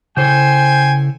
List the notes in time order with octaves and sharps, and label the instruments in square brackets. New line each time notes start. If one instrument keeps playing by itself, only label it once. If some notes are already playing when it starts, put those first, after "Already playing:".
[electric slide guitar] C#3 E4 A4 [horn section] C5 G5 G#5